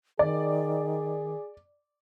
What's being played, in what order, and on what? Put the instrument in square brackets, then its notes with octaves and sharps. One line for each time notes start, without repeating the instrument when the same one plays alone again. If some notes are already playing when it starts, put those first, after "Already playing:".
[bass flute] D#3 [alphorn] G#4 [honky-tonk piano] D5